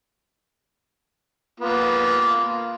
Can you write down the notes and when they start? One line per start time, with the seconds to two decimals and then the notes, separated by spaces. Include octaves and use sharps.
1.60 A#3 B3 F4